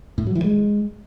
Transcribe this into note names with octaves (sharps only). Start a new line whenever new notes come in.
A2
F#3
E3
G#3